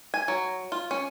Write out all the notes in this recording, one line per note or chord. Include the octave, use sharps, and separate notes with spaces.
G#5
F#3
F4
C#4